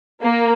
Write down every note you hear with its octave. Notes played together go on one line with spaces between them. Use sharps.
A#3